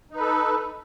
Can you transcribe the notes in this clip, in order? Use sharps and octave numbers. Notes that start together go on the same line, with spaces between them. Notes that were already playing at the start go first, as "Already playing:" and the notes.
D#4 A4 B4